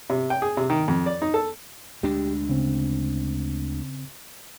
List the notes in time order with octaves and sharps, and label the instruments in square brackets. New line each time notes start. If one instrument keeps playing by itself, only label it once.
[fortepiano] C3
G5
G#4
C3
D#3
F2
D5
D#4
A4
[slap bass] D2 G#3 D4 [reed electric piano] G4
[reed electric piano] C#3 C4